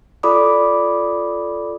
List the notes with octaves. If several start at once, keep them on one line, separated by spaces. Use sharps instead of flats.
F4 A4 D5 B5 D6 D#6